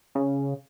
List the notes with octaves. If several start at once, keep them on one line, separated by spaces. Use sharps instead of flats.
C#3